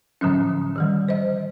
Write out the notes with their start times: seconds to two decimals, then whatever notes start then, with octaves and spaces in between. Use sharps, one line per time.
0.21 A2 D3 F3 F#3 C#4
0.76 D#3 E3 G3
1.09 C5 D#5